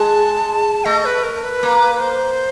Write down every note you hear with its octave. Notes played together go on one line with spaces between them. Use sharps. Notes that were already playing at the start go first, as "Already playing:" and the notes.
Already playing: G#3 A5
A3 D#5
B4
A#4
B4
A#3
B4
C5